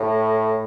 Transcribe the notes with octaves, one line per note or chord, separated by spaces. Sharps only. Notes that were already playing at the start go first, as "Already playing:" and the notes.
Already playing: A2